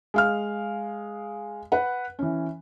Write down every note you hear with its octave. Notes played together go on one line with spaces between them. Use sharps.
G#3 F5 F6
B4 F#5
E3 C#4